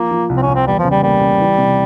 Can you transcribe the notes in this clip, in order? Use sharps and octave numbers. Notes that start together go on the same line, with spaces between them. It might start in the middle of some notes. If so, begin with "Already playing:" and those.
Already playing: F3 A#3
F3
C2
C4
C#4
C2
C4
E2 G3
F3
C#3
G3
G3 A#3
C#3
E3
C3